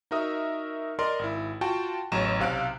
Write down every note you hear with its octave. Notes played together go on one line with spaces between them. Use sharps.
D#4 F#4 A#4 E5 D#6
A#4 D5 D#5 C6
G#1 E4
F4 F#4 G5 A5
A1 E2 F#3 F#4 A#5 E7
B1 C3 F5 F#6 D7